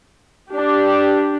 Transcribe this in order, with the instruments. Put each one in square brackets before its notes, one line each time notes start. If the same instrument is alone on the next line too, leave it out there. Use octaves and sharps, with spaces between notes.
[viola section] D4 G4